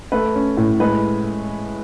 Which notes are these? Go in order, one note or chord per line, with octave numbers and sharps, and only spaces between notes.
A3 B4
C#4
A2
G#3 B4